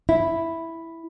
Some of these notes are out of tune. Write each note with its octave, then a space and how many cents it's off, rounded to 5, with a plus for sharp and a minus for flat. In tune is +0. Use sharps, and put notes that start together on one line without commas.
E4 +0